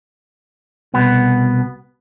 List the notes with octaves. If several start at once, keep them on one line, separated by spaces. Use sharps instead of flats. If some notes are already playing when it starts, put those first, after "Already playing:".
C2 B2 B3